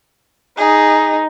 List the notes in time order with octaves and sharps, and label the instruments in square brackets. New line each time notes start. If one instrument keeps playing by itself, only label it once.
[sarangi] D#4 [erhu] G#4